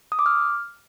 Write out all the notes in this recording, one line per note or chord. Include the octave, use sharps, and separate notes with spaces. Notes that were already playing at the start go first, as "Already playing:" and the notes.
D#6
D6
F6